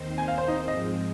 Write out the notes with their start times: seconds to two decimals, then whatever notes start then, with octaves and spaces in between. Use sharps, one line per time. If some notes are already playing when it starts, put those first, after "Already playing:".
Already playing: D#2 D#3 C4 D#4 C5
0.18 G#5
0.28 F5
0.38 C5
0.48 D#4
0.68 G#2 F3 G#3 C4 D#5